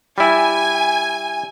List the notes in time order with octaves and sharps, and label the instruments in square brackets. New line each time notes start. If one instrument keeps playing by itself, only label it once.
[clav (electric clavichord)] G3 E4 [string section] G#5